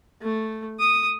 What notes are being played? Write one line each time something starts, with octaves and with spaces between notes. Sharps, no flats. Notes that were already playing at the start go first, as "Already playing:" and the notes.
A3
D#6